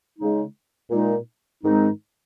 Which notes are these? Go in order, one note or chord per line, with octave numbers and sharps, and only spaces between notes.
C#3 G#3 D#4
A#2 G#3 D#4
G#2 D#3 G#3 C4 D#4